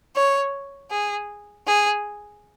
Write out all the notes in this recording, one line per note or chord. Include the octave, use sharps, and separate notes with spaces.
C#5
G#4
G#4